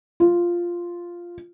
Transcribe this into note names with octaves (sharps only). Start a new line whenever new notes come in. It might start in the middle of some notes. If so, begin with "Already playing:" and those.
F4